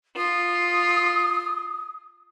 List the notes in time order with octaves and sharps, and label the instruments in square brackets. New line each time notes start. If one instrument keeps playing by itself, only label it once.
[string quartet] F4 [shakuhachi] D#6